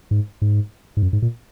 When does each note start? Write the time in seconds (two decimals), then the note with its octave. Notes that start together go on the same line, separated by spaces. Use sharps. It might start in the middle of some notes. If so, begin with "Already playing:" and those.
0.11 G#2
0.42 G#2
0.97 G#2
1.03 F#2
1.13 G#2
1.22 A#2